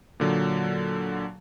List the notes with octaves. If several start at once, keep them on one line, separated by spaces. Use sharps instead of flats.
A#2 D3 F#3